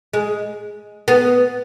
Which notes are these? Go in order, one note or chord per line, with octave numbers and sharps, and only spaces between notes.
G#3
B3